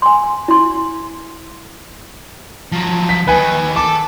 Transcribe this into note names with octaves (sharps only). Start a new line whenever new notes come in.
G#5 C6
E4 C6
F3 F#3
B6
D#2 D#3 B4 G#5
A4 D6